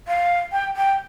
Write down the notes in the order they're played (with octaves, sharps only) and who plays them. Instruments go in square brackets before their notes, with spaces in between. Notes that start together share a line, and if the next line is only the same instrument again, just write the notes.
[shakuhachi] F5
G5
G5